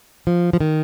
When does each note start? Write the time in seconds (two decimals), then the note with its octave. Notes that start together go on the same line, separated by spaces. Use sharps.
0.27 F3
0.53 F3
0.60 D#3